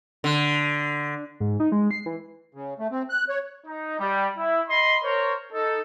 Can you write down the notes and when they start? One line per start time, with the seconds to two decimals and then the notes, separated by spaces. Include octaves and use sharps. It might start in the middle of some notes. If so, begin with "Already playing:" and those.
0.24 D3
1.40 G#2
1.60 D#4
1.72 G#3
1.91 C7
2.06 E3
2.54 C#3
2.79 A3
2.91 C4
3.10 F#6
3.29 C#5
3.66 D#4
4.00 G3
4.37 E4
4.68 D#5 B5 C6
5.03 A#4 C5 C#5
5.52 D#4 A4